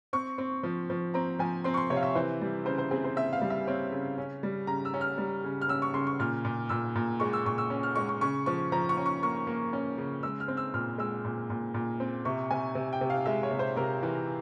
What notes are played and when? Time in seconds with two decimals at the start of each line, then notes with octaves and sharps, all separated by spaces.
0.13 C4 C#6
0.38 C4
0.63 F3
0.90 F3
1.14 C4 A#5
1.39 F3 G#5
1.64 C4 C6
1.74 C#6
1.77 C6
1.90 C3 C#5
1.96 F5
2.03 E5
2.15 E3 C5
2.41 G3
2.65 C#3 C5
2.78 C5
2.91 C4 G#4
3.04 C5
3.16 C4 E5
3.33 F5
3.41 G3
3.50 E5
3.67 C4 C#5
3.92 C#3
4.18 C#4
4.43 G3
4.67 C#3 A#5
4.85 E6
4.94 C#4
5.01 F6
5.18 G3
5.44 C#3
5.61 F6
5.69 C#4 E6
5.82 C#6
5.94 C#3 C6
6.07 C#6
6.19 A#2 F6
6.45 A#2
6.69 A#2 E6
6.95 A#2
7.20 G#3 C#6
7.33 E6
7.45 A#2 C#6
7.58 E6
7.70 C#4
7.83 F6
7.95 G#3 C#6
8.09 C#6
8.21 C#3 C#6
8.46 F3 C#6
8.72 F3 A#5
8.89 C#6
8.97 C#4
9.06 C#6
9.23 A#3 C#6
9.47 A#3
9.73 C#4
9.98 C#3
10.23 G#3 E6
10.40 F6
10.48 C4
10.57 E6
10.74 A#2 F6
10.98 G#3 E6
11.25 A#2
11.50 A#2
11.74 A#2
12.00 C4
12.25 C3 C#6
12.51 C3 G#5
12.75 C3
12.93 G5
13.01 C3
13.10 F5
13.26 G#3 E5
13.43 C#5
13.51 C3
13.59 C5
13.76 C3 A#4
14.03 E3